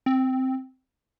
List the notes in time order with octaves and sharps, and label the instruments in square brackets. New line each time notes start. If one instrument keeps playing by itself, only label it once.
[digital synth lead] C4